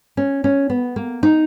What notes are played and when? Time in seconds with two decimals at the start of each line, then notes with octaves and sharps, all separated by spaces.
0.17 C#4
0.44 C#4
0.70 B3
0.96 A#3
1.23 D#4